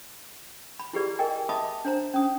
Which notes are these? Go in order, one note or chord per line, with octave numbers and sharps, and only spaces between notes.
B5
E4 F4 G4 G#4 B4 D5
G#4 A#4 D#5 G5 G#5
D#5 E5 A5 B5 D6 D#6
D4 C5 A#5
C#4 D#6